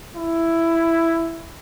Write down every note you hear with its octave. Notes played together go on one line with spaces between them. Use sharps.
E4